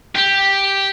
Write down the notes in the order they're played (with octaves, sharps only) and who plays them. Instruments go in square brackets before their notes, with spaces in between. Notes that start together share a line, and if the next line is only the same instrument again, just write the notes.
[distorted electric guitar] G4